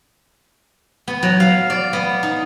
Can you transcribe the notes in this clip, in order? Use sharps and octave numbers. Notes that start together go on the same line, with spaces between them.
B3
F#3
F5
D5
B3
D#4